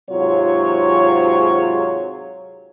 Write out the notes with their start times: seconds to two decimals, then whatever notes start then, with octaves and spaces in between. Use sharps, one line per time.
0.10 G#2 C3 F#3 F4 C#5